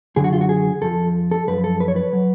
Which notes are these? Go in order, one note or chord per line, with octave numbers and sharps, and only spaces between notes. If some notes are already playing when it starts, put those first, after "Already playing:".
F#2 D3 F#3 G#4
F#4
F4
F#4
G#4
F2 F3 A4
A4
F#2 F3 B4
A4
B4
C#5
B4
F#3